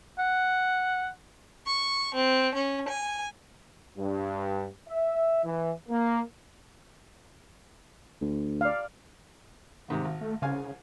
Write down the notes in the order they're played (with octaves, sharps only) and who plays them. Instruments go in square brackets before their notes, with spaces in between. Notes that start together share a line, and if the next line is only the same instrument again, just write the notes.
[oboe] F#5
[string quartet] C#6
C4
C#4
G#5
[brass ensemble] G2
E5
E3
A#3
[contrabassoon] D2
[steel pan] D5 F5
[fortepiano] D#2 G#2 C3
G#1
[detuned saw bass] A3
[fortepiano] C2 F5 G#5 [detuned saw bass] C#3